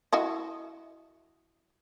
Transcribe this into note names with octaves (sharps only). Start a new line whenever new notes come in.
E4 F#4 D#5